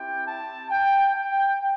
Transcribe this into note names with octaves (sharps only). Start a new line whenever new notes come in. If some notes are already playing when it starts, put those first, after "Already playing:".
Already playing: C4 E4 G4 G5
A5
G5
G5